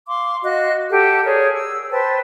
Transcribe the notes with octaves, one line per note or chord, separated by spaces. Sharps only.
F5 C6 D6
F#4 D#5 F5 F#6
G4 A4 F#5
G#4 A#4 C#5 D5
E6
B4 C5 G5 A5